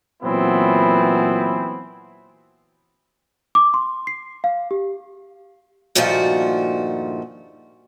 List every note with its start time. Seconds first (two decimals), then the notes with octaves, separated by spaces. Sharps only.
0.23 A#2 E3 F#3 B3 C4 E4
3.55 D6
3.74 C6
4.07 C7
4.44 F5
4.71 G4
5.95 G2 A#2 D#3 F3 A3 F#4